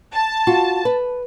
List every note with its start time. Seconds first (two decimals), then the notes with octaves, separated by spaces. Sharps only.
0.13 A5
0.47 F4 F#4
0.85 B4